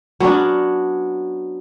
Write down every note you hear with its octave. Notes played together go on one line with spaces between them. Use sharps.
F#3 B3 C#4 D4